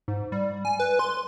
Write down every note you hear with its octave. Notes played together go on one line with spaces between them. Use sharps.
G#2
G3
G#5
B4
C6